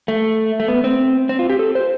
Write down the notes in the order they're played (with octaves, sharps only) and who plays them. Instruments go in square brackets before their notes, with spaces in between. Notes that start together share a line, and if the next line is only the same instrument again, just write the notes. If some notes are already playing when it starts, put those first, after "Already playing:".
[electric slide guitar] A3
A3
B3
C4
C4
F4
G4
A4
C5